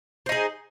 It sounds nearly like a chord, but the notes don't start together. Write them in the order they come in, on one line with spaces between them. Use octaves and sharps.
C5 D#4 G#4